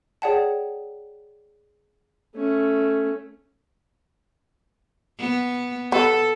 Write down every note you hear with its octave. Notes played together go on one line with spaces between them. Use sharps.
G#4 C#5 D5 F#5 G5 A5
A3 C#4
B3
B3 A4